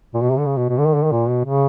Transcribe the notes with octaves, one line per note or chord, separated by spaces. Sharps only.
A#2
B2
C3
D3
C#3
B2
B2
D3
D#3
D3
D#3
A#2
B2
C#3